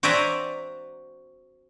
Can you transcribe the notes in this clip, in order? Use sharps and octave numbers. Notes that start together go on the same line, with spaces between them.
F#4 C5 D5 E5 G#5 A#5